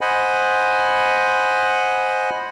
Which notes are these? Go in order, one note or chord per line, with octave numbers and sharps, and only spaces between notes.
C5 D#5 F#5 G#5 B5